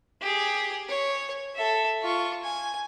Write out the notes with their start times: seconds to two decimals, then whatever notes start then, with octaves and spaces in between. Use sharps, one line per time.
0.22 G4 G#4
0.89 C#5
1.55 A4 E5
2.02 F4 C#6
2.43 G#5